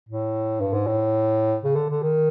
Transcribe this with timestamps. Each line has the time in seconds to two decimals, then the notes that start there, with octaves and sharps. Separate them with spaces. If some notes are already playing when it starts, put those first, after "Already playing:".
0.09 A2
0.61 G2
0.73 G#2
0.87 A2
1.64 C#3
1.76 D3
1.90 D3
2.03 D#3